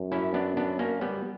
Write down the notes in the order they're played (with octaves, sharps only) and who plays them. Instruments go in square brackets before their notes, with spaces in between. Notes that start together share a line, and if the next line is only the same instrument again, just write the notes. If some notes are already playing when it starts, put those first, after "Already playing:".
Already playing: [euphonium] F#2
[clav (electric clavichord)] C#4 E4
B3 D4
B3 D4
A#3 C#4
G3 B3